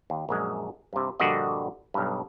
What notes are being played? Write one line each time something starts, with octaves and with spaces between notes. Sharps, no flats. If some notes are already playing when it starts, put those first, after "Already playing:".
D#2
A#1 F#2 G#3
G2 C3
A#1 G2 D3 F#4 D5 D#5
B1 G2